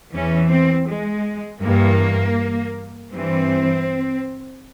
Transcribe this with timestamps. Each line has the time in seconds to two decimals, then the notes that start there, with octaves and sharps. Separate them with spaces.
0.12 E2 E3 C#4
0.50 C4
0.87 G#3
1.62 G2 E3 A#3
3.11 G2 E3 C4